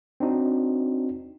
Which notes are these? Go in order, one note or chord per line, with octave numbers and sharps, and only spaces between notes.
C4 D4 D#4 F#4